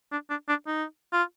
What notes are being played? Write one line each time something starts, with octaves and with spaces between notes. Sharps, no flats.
D4
D4
D4
D#4
F4